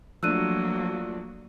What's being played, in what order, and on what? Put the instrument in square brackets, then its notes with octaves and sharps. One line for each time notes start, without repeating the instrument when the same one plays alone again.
[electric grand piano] F3 A3 D4 [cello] F#3 A#3 [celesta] E6 F#6 D#7